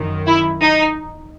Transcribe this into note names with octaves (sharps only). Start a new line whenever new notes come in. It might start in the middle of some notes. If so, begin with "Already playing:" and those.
Already playing: F#2 D#3
E4
D#4